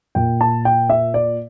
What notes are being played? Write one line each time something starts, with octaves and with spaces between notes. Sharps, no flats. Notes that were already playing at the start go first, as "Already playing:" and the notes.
A#2 G5
A5
G5
E5
D5